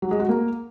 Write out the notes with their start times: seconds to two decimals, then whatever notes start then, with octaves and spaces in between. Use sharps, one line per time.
0.02 F#3
0.11 G#3
0.20 F#4
0.29 A#3